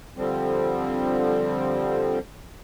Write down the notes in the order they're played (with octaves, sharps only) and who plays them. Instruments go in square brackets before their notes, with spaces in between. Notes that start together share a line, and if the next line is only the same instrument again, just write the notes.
[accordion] D3 F3 G3 C4